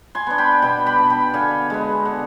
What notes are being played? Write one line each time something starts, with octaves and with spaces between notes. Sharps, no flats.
G#5 C6
B3 D4
G5 B5
B2 G5 B5
G5 B5
B3 D4
G5 B5
D3 F5 G#5
G#3 B3
D3